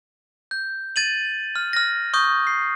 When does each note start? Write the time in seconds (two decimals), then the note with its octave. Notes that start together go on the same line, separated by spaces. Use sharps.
0.51 G6
0.96 G#6 A6 D#7 F#7
1.56 F6
1.73 F6 A#6
2.14 C#6 D#6 G6
2.47 C7